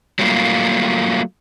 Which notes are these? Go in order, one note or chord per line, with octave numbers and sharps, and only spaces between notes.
F#3 G3 A3 A#3 F4